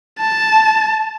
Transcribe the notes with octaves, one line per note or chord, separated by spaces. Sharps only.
A5